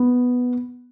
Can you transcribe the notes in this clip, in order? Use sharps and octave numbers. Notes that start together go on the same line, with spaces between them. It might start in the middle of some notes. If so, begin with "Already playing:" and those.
Already playing: B3